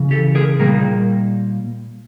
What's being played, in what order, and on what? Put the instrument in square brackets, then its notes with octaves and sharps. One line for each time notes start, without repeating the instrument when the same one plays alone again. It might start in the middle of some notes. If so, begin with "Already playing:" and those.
Already playing: [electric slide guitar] C#3 E3
G4 A4
G#4 A#4
A#2 G3 A#3 G#4 A#4